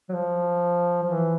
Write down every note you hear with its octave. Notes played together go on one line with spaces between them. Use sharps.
F#3
F3
F3
E3